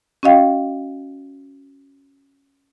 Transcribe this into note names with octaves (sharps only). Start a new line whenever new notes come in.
C#4 F#4 D#5 F5 G5